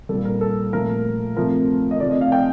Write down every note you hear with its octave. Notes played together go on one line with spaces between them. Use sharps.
A#2 G3 A4
A#4
A4
A#2 F3 A3 A#4
C3 F3 A3 A#4
D#5
C3 F3 A3 D5
D#5
F5
G5